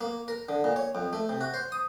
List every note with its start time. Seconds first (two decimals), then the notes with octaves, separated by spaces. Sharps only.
0.01 A#3
0.28 A#4
0.49 D3
0.64 A#2
0.76 C#5
0.95 F2
1.13 A3
1.29 C3
1.41 F#4
1.54 C5
1.72 D#6